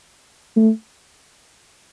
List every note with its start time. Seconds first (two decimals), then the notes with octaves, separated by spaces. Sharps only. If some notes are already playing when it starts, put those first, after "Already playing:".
0.56 A3